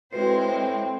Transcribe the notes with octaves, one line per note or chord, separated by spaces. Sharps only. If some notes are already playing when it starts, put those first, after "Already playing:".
A2 G#3 C4 F#4 B4 C5 C7